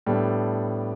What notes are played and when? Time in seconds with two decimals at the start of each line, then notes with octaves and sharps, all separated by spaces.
0.06 A2 G3 B3 D4 A4